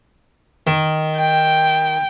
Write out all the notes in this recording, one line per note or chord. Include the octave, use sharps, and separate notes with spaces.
D#3
G5